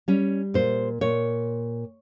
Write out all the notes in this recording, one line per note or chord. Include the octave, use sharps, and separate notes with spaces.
G3 C#4
A#2 C5
A#2 C#5